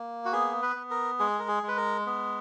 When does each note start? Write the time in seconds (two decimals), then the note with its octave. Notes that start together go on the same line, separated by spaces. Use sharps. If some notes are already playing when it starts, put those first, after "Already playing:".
Already playing: A#3
0.25 F#4
0.32 B3 G#4
0.62 B4
0.76 B3
0.91 A#4
1.19 G#3 G#4
1.39 A#4
1.48 G#4
1.63 G#3
1.68 B4
1.77 A#4
2.06 B3